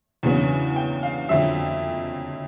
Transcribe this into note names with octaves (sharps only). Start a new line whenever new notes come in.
E2 C#3 F#3 B3 D4
G5
F5
F2 D3 F#3 E5